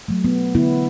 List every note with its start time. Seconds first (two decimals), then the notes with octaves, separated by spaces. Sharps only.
0.08 F#3 A3
0.25 B3
0.55 D3 B3 E4